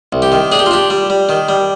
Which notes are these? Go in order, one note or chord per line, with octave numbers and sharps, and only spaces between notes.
C2
G4
D#3
D4 G#4
G4
F4
D4 G4
G3
G3
D#3
G3